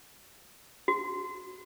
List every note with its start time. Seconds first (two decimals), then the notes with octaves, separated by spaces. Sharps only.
0.88 F#4